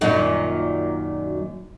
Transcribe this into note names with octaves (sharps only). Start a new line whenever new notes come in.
F#2 A#2 D#3